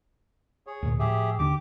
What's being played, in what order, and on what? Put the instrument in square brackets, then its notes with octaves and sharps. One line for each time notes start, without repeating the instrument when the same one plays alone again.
[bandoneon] G#4 C#5
[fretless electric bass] D2 A#2
[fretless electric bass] A2 F3 [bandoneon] G4 G#4 E5
[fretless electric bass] D#2 D3 D4 [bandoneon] G4 D6